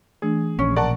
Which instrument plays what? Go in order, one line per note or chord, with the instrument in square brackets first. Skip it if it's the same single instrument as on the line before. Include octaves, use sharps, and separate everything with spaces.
[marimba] E3 A3 D4 [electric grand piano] G#4
[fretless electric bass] A#1 [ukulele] C#4
[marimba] B2 C#6 [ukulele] A#4 [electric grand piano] D5 F#5 A5